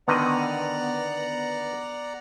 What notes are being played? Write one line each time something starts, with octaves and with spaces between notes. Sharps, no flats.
D3 D#3 B3 D5 D#5 F#5 A#5